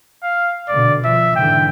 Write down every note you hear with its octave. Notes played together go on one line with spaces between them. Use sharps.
F5
B2 D3 D5
F3 E5
G#2 D3 E3 G5